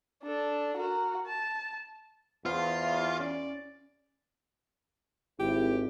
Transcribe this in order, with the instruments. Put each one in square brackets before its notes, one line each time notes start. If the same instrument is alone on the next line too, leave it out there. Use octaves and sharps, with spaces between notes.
[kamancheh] D4 A4
F#4 A#4
A5
[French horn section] E2 [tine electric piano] B3 C5 [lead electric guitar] F4 [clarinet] F5
[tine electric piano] C#4 [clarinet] D5
[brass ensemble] G#1 [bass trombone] E4 [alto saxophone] G4